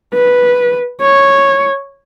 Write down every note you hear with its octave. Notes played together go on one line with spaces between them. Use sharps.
B4
C#5